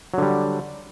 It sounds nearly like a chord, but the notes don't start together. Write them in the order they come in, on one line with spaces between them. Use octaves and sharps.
F#3 D3 G3